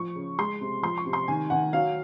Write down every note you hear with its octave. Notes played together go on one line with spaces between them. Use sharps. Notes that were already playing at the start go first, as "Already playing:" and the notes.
Already playing: F3 C#6
C#3
G#3 C6
C3
F3 C6
C#6
C3
C6
D#3 G#5
D#3 F#5
F#3 F5